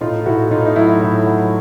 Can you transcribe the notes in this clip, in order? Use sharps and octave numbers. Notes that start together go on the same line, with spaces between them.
A2 D#4 F4
A2 E4 F#4
A2 D#4 F4
D#4
F#3 E4
A2
F#3